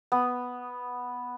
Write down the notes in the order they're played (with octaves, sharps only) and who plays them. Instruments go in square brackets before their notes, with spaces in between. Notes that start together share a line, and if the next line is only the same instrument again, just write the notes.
[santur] B3